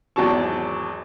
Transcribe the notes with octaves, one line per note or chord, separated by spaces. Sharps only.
G#1 E2 F#3 A5 C#6